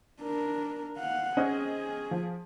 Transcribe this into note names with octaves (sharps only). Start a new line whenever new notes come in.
D4 A#4
F5 F#5
C4 C#4 G#4 D#5
F3